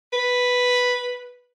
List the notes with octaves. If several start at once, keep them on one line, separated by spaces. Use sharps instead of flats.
B4